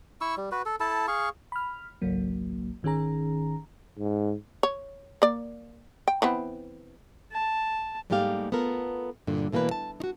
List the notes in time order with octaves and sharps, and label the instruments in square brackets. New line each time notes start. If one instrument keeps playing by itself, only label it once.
[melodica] E4 C#6 E6
G3
F#4 B4
A4
E4 A4 A5
G#4 F5 C#6
[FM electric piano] B5 F6
G#1 C#2 F#3 A#3
G#1 D#3 C#4 G#4 A#5
[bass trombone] G#2
[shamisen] C#5
A#3 D5
G5
E3 B3 C4
[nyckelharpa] A5
[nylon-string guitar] G#2 G3 A3 A#3 G4 F5
B3 F4 A4 A#4
G2 A#2 D3
B2 E3 A#3 D4 B4
A5
D#4 F#4